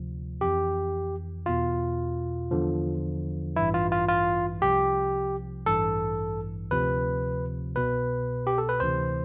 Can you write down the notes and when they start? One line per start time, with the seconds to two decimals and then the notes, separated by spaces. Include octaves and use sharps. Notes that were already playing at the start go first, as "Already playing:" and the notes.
Already playing: D2 C3 F3
0.41 F2 E3 G4
1.46 E2 B2 F4
2.51 E2 D3 F3
3.56 A1 G2 E3 E4
3.74 F4
3.92 F4
4.08 F4
4.62 C2 C3 F3 G4
5.66 A1 G2 E3 A4
6.71 D2 C3 F3 B4
7.75 C2 B2 B4
8.47 G4
8.58 A4
8.69 B4
8.80 D2 C3 E3 C5